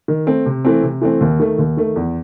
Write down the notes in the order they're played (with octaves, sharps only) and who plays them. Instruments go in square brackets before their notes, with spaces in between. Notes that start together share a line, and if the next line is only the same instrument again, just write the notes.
[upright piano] D#3
A3 C4
C3
E3 A3 C4
C3
E3 A3 C4
D#2
D#3 A3
D#2
D#3 A3
E2